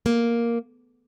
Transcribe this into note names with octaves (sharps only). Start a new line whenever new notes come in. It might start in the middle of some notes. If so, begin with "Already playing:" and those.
A#3